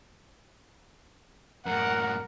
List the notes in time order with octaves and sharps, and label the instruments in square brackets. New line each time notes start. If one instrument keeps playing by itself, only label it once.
[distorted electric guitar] F#2 A2 [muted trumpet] A#4 [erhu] F#5